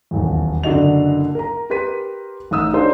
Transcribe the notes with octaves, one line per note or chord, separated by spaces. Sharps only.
D#1 B1 E2
F#1 D3 D4 F#4 D#5 F7
A#4 A#5
G4 A#4 B4 C6 B6 D#7
A1 D#4 D#6 E6
D4 D#4 G4 A#4 C5 C#5